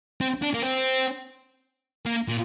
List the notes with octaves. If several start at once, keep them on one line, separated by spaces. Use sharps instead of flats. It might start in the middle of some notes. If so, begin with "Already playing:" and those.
C4
D4
A#3
C4
A#3
A#2